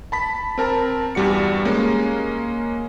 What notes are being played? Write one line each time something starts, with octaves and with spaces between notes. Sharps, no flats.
A5 B5 B6
C4 A#4 A5 A#5
E2 G2 G3 F#4 C#7
G#3 A#3 C#4